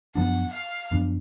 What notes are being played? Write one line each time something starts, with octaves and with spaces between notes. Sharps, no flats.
F#2 F3 B3 D4 F#5
F5
F#2 F3 B3 D4